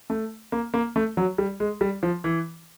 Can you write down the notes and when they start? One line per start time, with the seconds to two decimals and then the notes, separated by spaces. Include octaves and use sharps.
0.10 A3
0.52 A#3
0.74 A#3
0.96 A3
1.17 F#3
1.38 G3
1.60 G#3
1.81 G3
2.03 F3
2.24 E3